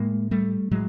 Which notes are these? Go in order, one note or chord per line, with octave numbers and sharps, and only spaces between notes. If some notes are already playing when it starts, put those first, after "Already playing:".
Already playing: A2 G#3 A#3
G3 A3
A2 F#3 G#3